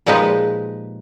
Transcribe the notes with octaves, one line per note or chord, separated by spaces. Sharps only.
A#2 F3 G#3 D#4 G4 B4